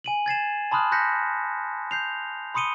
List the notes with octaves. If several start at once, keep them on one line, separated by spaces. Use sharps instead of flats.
G#5 D#7 F#7
G#6 A6 C7 E7
A5 B5 C6 D#6 F6 F#6
C6 F#6 G6 A#6 B6 C#7
G6 C7 F7
B5 C6 D#6 C#7 D#7 G7